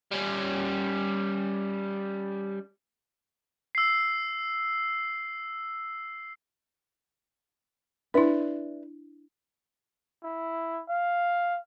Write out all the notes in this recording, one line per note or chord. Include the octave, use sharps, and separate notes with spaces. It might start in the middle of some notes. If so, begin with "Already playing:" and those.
G3 C#4
E6 C7
D4 E4 B4 D5 E5
E4
F5